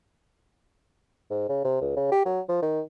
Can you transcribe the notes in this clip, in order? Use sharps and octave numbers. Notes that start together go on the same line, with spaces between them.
G#2
C#3
C3
C#2
C#3
G4
F#3
F3
D#3